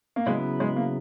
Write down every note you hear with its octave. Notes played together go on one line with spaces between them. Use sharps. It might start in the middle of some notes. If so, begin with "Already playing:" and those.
A#3
C#3 F#3 G#3 B3 E4 B4
G#3
A#3